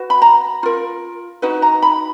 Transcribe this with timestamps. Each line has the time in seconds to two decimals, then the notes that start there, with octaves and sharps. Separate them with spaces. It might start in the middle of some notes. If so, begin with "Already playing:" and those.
Already playing: F#4 B4
0.10 B5
0.22 A#5
0.63 F4 A#4
1.42 D#4 F#4 B4 F#5
1.62 A#5
1.82 B5